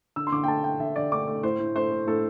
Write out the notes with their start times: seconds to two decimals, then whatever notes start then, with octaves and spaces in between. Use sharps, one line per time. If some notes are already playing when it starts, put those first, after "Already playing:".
0.16 D3 E6
0.27 C6
0.32 D3 D6
0.44 G5
0.48 A3 A5
0.64 A3 G5
0.80 D3 E5
0.96 D3 D5
1.12 A3 D6
1.27 A3
1.43 A2 C5
1.59 A2
1.75 A3 C5
1.91 A3
2.07 A2 A4